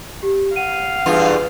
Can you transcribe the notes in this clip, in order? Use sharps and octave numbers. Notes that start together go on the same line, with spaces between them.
G4
F5 F#5 D#7
E2 G2 F4 B4